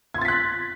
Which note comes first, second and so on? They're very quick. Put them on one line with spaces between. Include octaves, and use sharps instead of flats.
G#6 C6 A6 B6 F#6